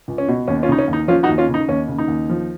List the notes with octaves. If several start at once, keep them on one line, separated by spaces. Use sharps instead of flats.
C#2
C#4
B2
D#2 C#4
C#4 F4
C#3 D#4
C#4
D#2
D#4
F3 C#4 F4
D#4 F#4
D#2
C#4 F4
C#3
D#4
D#2 C#4
C#3
D#4
D#2
F3